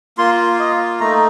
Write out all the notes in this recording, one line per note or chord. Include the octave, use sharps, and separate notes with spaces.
A#3 F4 C6
D#5
A3 D#4 A#5